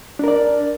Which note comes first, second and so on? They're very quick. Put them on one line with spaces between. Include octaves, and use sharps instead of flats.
D4 A#4 D5